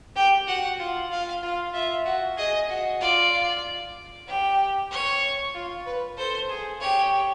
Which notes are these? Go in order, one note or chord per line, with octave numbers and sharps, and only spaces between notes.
G4 G5
F#4 F#5
F4
F4 F5
F4
F4 E5
F#4
G#4 D#5
F#4
F4 D5
G4
C#5
F4
B4
A4 C5
G#4
G4 C#5